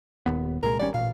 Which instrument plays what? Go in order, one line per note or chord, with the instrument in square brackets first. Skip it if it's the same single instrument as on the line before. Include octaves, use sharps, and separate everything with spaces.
[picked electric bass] D#1 D#2 B3
[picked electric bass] C2 A#2 G#3 [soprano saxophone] A#4
[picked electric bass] G#1 G3 C#4 [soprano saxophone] D5
[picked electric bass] A1 A#2 [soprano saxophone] F5